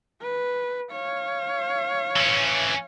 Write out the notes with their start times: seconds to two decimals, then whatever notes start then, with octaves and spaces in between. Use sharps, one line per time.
0.22 B4
0.92 C#5 F5
2.16 E3 C#4